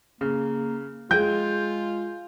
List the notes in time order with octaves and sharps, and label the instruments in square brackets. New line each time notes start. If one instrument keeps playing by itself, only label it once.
[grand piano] C#3 [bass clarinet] A#3
[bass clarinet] G#3 [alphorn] F4 [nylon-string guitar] G#4 G5 [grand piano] G6